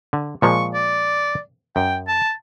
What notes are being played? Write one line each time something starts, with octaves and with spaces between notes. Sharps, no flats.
D3
A#2 F3 G#3 C#6
D5
F#2 G5
A5